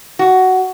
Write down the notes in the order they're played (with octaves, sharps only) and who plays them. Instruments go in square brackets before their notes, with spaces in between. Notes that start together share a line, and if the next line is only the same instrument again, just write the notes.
[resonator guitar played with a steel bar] F#4